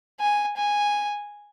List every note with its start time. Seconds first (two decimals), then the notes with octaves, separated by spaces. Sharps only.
0.20 G#5
0.57 G#5